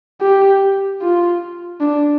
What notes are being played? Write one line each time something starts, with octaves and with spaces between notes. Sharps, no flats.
G4
F4
D4